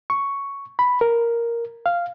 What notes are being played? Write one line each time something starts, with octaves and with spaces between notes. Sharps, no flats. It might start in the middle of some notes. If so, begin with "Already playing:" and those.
C#6
B5
A#4
F5